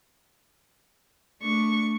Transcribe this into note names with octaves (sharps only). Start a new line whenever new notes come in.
A3 D4 C#6